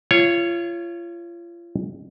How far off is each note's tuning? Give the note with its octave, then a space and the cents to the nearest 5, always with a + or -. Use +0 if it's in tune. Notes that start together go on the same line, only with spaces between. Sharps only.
F4 -30 C#5 +0